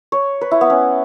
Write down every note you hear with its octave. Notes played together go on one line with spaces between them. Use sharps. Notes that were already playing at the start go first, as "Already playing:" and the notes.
C#5
B4
E4
B3
C#4